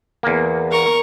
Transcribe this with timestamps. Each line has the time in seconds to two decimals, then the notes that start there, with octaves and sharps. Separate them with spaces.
0.23 E2 A#3
0.71 A#4 C#6